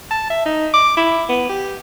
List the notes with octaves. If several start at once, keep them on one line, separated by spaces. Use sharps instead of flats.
A5
E5
D#4
D6
E4
B3
G4